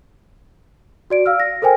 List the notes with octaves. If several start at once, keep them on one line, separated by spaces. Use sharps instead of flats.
F#4 D5 D7
F5 E6 F6
A#6
A4 A#4 C5 G5 G#5